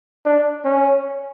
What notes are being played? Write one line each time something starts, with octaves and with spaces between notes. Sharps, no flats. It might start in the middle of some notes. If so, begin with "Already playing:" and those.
D4
C#4